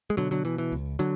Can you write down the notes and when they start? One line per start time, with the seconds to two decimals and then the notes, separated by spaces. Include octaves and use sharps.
0.10 G#3
0.17 B2 D3 F#3
0.31 D3 F#3
0.45 B2 E3
0.58 E3
0.72 C#2
0.99 D3 F#3